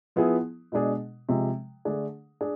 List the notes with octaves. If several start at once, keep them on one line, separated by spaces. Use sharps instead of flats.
F3 B3 E4 G#4
B2 G#3 D4 G#4
C3 F3 G#3
D3 A3 D4 G#4
D4 G#4